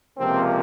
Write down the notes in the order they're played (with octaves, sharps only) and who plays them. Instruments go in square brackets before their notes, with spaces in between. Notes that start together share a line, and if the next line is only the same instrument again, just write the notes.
[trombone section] C#2 C3 F3 A#3 C4